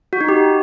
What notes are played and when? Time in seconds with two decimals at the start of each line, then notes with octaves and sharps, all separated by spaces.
0.13 F#4
0.21 D#4
0.29 G4